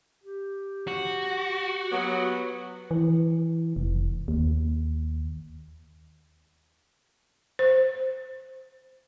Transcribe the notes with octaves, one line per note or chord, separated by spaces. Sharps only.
G4
F#4
F#3 B3
E3
F1
D#2
C5